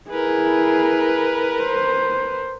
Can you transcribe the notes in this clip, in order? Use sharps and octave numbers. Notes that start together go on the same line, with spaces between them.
E4 G#4 A#4 B4
C5